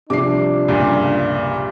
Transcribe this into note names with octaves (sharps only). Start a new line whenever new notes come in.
C3 F3 G3 D4 D6 C7
C#2 G2 A#2